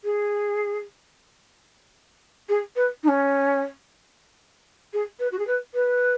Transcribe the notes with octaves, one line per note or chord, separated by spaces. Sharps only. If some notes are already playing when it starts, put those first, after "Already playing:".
G#4
G#4
B4
D#4
C#4
G#4
B4
F#4
G#4
B4
B4